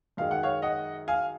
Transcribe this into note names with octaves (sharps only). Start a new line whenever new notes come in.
F#2 D#3 G#3 F5
F#5
C#5 F5
D#5 F#5
F5 G#5